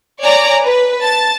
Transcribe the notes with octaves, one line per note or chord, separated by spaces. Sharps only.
C#5 D5 G#5 A#5 D6
B4
A5 A6